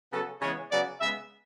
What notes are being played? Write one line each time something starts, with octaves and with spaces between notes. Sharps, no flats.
C#3 F#3 B3 A4
C#3 E3 G#3 B3 C#5
C#3 F#3 B3 D5
C#3 G#3 B3 E5